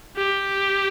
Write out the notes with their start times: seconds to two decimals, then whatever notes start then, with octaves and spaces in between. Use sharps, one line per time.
0.17 G4